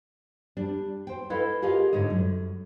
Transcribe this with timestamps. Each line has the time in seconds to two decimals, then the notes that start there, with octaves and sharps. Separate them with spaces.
0.57 G3 D4
1.07 C5 G5
1.30 E4 A4 B4 D#5 F5
1.62 F4 G4 G#4 A#4 D#5 F5
1.93 G#2 D3 C#5 D#5
2.10 F#2